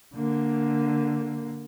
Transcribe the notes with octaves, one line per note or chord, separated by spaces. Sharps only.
D3 A#3